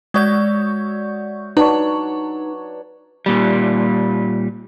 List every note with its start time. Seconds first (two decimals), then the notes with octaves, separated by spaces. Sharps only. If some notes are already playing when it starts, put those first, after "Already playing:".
0.14 G#3 F#4 C#5 D5 E5 G6
1.57 F#3 D4 D#4 B4 C#5
3.26 A#2 G3